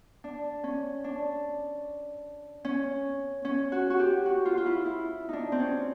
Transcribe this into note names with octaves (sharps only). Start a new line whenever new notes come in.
D4
C#4
D4
C#4
C#4
F#4
F#4
G4
F#4
F4
F4
E4
E4
D4 D#4
C4
C#4